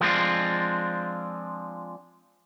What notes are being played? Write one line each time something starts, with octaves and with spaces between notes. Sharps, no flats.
F3 G#3 B3 C4 D4 F4